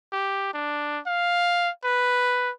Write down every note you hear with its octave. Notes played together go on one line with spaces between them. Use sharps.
G4
D4
F5
B4